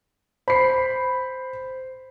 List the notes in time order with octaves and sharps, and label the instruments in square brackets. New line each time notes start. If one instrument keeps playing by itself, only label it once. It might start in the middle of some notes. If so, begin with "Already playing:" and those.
[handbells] C5 [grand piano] B5 C7